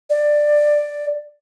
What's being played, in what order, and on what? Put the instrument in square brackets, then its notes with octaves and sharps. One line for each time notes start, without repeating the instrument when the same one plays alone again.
[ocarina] D5